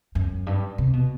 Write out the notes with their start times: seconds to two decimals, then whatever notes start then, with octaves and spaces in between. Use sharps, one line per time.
0.15 F#2
0.47 G2
0.78 C3
0.93 B2